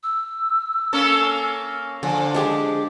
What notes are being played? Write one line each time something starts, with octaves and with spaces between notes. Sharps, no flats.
E6
A#3 C#4 A4
D3 F3 G#5
G#3 D4 G4 G#4